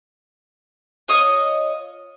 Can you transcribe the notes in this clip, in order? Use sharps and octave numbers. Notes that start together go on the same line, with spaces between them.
F4 C#5 D#5 D#6